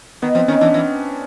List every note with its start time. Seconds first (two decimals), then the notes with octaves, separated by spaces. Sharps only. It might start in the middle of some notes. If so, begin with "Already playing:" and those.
0.22 D#3 B3
0.35 F3 C4
0.48 D#3 C#4
0.61 E3 D4
0.74 E3